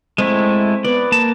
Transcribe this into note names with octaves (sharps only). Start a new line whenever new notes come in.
G#3 A3 C4 E4
B3 D5
A#3 A5